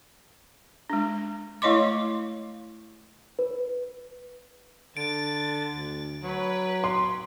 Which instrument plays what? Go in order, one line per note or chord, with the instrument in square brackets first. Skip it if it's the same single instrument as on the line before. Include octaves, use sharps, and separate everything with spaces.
[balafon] G#3 D4
A3 E4 C#5 D#5 C6 D6
[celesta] B4
[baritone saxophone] D3 [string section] A6 [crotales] D7
[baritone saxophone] D2
[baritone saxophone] F#3 [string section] B4
[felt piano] C6